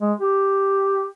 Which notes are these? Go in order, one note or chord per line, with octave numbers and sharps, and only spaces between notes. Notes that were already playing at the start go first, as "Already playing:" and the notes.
G#3
G4